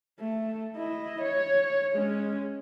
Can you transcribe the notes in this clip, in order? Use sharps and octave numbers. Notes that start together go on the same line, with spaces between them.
A3
E4 D#5
C#5
G#3 C#4